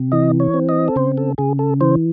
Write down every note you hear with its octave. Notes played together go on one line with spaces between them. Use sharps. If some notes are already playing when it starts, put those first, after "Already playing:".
Already playing: C3
E3 D#5
C#5
C4
D#5
A4
C#3 C5
A4
C#3 G#4
A4
E3 C5